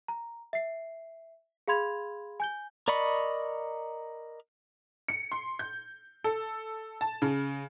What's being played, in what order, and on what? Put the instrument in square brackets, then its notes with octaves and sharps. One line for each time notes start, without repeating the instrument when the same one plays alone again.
[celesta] A#5
E5 C7
G#4 F5 B5 C6 G#6 F7
G#5 G6 G7
[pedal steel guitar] A#4 D5 D#5 B5 C#6
[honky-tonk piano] C#7
C6
G6
A4
A5
C#3